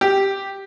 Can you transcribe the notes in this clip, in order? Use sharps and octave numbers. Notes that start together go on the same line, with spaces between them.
G4